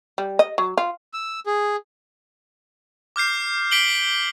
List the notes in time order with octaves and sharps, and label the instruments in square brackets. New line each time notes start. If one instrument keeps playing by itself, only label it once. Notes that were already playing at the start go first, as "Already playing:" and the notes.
[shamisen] G3
D#5
F#3
F4
[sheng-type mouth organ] E6
G#4
[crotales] D6 F6 G6 C7
F6 B6 D7 F#7 G7